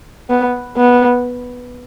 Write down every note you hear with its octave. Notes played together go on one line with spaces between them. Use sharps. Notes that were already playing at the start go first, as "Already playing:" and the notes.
B3
B3